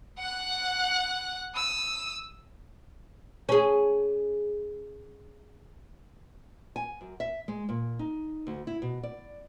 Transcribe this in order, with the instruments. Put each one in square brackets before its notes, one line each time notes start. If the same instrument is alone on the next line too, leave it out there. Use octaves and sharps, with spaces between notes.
[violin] F#5 F#6
D#6 E6
[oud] C#4 G#4
[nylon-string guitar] G#5
F#2
E5
G#3
A#2
D#4
D2
E4
B2
D5